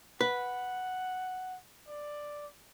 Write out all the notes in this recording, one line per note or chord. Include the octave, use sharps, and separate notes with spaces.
B4 F#5
D5